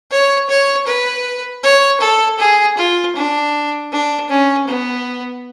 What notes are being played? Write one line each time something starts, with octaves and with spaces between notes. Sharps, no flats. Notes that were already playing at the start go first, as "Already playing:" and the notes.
C#5
C#5
B4
C#5
A4
G#4
F4
D4
D4
C#4
B3